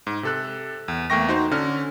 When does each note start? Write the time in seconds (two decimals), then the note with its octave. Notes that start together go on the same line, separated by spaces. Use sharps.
0.07 G#2
0.23 C3 A4 F#6
0.88 E2
1.10 E2 A3 A#3 G5 C#6 A#6
1.29 D#4 F#4 C5
1.52 D3 C#4 F6